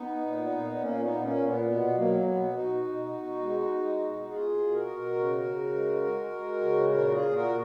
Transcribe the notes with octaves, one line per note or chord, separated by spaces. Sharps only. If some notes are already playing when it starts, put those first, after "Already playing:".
Already playing: B3 D#4
A#2
A#2
A#2 A#3 C#4
B3 D#4
A#2
A#3 C#4
A#2
B3
A#3
B2 B3
F#3 A#3
B2 B3
B2 D#4 F#4
B2
B2
G#3
G#3
B2
B2 F4 G#4
B2
F#4 A#4
B2
C#3
C#3
G#3
G#3
G#3
C#3
A#2 F#4 A#4
F4 G#4
A#2
F#4 A#4
A#2